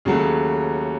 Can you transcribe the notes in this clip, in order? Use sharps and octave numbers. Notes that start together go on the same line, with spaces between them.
D#2 C#3 F#3 A3